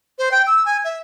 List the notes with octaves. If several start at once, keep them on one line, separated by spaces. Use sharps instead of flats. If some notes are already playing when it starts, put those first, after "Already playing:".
C5
G5
E6
G#5
E5